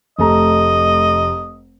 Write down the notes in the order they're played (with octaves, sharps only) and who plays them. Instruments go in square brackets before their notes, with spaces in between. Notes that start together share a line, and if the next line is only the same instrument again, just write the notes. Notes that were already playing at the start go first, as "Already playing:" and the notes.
[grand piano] F1 A3 A#5 [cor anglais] D#5